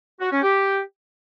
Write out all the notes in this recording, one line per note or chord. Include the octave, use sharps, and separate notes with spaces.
F#4
C#4
G4